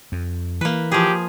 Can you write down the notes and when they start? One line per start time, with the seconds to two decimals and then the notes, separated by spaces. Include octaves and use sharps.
0.12 F2
0.61 E3 A#3 B4
0.92 F3 G4 G#4